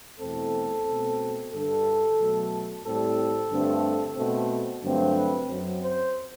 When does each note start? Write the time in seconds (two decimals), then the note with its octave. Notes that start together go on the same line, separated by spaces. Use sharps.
0.19 E2 B2 A3 C4 A4
0.85 B2 A3 C4
1.52 G2 D3 G3 A4
2.17 B2 F#3 A3
2.83 A2 G3 C4 A4
3.51 G2 D3 A3 C4
4.16 B2 A3 C4
4.83 G2 D3 F#3 A3 C4
5.15 B4
5.49 F#2 F#3 C4
5.82 C5